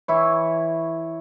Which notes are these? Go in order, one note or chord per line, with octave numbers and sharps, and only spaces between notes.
E3 E4 C#5